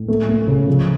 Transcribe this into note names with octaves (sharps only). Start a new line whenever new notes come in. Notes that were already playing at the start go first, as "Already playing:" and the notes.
Already playing: A2
A3
A3
C#3
F3